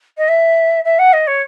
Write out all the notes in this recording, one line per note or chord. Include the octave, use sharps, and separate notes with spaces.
D#5
E5
E5
F#5
D#5
C#5